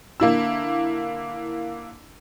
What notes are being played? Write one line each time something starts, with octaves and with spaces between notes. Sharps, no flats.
D3 A#3 E4 E6